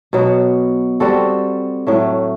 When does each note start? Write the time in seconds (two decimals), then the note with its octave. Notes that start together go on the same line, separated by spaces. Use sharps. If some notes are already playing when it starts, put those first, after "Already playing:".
0.13 B2 F#3 B3 F#4
1.00 G3 C4 F#4 A4
1.87 A2 F#3 A3